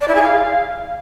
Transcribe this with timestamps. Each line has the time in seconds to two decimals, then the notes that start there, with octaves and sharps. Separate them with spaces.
0.01 D5
0.08 E4
0.15 G#4
0.22 F5